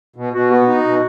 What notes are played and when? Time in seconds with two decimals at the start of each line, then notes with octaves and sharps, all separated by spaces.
0.16 B2
0.33 B2 F#4
0.51 B3 F#4
0.68 D#4
0.85 B2